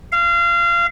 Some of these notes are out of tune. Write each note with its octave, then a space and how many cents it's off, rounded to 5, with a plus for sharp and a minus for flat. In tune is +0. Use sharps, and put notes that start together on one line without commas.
F5 -25